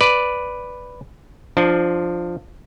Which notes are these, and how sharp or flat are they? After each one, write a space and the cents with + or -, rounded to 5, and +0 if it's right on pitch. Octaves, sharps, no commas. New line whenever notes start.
B4 +0 D5 +0
F3 +0 D4 +20